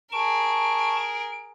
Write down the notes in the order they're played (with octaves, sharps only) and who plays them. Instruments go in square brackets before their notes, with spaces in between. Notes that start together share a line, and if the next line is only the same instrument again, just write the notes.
[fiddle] G#4 A#4 [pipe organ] A5 C#6 [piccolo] D7